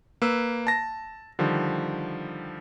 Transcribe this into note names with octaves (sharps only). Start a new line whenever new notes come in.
A#3 B4 E6
A5 A#6
D3 D#3 F3 G3